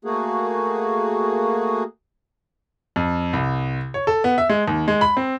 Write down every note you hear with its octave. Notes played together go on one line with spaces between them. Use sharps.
A3 A#3 F#4 G#4
F2
C2
C#5
A4
B3
E5
G#3
D#2
G#3
B5
C4